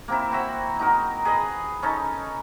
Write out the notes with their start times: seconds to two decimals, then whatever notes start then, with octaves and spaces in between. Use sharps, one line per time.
0.08 A#3 C4 E4
0.32 C4 F#4 E5
0.79 D#4 F#4 A#4
1.25 G#4 B4 D#5
1.82 C#4 D#4 A4 C#5